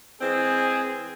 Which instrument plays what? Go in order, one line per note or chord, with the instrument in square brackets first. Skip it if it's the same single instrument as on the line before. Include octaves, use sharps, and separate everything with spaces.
[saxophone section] E3 G#3 C4 [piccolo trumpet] G#4